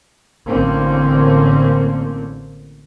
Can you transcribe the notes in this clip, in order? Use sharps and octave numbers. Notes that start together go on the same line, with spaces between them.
A1 D3 A#3 C4 C#4